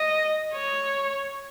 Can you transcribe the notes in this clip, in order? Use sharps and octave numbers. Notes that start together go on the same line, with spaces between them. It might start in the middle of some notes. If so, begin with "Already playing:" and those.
Already playing: D#5
C#5